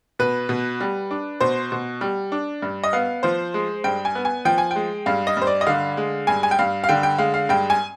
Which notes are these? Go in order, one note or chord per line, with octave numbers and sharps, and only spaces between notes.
B2 B4
B2
G3
D4
B2 C5
B2
G3
D4
G2
D#5
B3 F5
F3 C5
G#3
G2 G5
G#5
B3
G#5
F3 G5
G#5
G#3 G5
G2 F5
D#5
G2 C5
D5
D#5
D3 F5
G#3
G2 G#5
G#5
G5
G2 F5
F5
D3 G5
G5
G#3 F5
F5
G2 G5
G#5